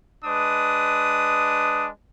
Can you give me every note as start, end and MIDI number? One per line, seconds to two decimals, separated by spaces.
0.25 1.88 56
0.25 1.88 62
0.25 1.88 71
0.25 1.88 87